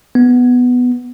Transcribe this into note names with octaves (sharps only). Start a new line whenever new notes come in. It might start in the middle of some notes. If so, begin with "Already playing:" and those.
B3